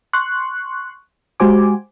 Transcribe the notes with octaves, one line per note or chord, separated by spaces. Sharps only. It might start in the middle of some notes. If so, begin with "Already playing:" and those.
C6 C#6 F#6
G#3 F#4 G4 C5 G#5 D6